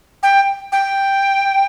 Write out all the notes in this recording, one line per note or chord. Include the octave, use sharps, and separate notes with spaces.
G5
G5